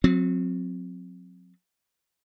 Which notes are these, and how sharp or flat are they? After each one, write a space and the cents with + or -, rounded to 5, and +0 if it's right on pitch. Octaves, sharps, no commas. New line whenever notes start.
F#3 -35 C4 +0